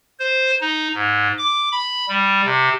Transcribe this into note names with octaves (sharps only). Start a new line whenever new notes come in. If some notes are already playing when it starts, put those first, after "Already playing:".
C5
D#4
G#2
D6
B5
G3
C3